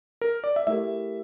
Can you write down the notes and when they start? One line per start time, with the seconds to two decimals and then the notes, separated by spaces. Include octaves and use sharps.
0.21 A#4
0.44 D5
0.56 E5
0.67 A3 E4 G4 A#4 E5